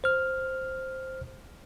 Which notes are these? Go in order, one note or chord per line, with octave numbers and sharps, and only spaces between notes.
C5 F6